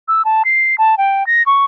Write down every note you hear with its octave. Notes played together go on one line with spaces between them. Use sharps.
E6
A5
C7
A5
G5
A#6
C#6